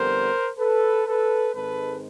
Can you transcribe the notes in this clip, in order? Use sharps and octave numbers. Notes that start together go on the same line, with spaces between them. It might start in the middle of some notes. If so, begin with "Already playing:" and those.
Already playing: F2 D3 G3 B3 A#4 C5
A4 B4
A4 B4
G#2 D#3 G#3 C4 A4 B4